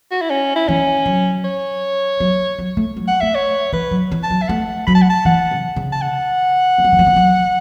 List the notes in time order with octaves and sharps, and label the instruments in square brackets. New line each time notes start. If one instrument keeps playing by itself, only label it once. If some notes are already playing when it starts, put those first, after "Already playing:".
[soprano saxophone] F#4
E4
C#4
E4
[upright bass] E3 [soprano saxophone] C#4
[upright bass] F#3
[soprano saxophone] C#5
[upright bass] F#3
F#3
A3
F#3
[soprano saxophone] F#5
[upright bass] A3 [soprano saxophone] E5
[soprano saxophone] C#5
[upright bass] E3 [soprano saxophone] B4
[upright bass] F#3
E3
[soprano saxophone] A5
[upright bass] F#3
[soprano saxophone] E5
[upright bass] A3 [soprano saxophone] F#5
[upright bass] F#3 [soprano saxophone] B5
[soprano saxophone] A5
F#5
A5
[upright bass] E3 [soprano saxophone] F#5
[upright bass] C#3
C#3
[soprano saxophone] A5
F#5
[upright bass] E3
F#3
E3
F#3
E3
F#3